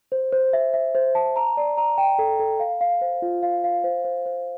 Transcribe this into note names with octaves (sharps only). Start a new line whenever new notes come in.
C5
C5
E5
E5
C5
A5
A#5
D5
A#5
G5
A4
A4
F5
F5
C5
F4
F5
F5
C5
C5
C5